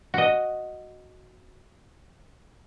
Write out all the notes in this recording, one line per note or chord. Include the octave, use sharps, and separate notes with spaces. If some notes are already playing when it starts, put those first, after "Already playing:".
F#4 D#5